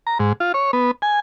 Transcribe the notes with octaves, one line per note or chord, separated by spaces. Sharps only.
A#5
G#2
F4
C#5
B3
G#5